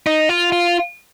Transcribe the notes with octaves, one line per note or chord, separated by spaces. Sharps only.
D#4
F4
F4